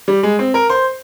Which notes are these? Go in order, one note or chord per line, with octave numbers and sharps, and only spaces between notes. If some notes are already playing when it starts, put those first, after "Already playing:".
G3
G#3
C4
A#4
C5